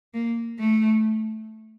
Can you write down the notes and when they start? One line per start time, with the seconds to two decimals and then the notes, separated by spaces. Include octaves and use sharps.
0.14 A#3
0.60 A3